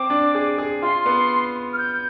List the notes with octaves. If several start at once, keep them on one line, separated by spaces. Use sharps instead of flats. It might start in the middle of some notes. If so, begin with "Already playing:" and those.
Already playing: C4 D6
D4
G#4
G#4
F4 C6
B3
F6
G6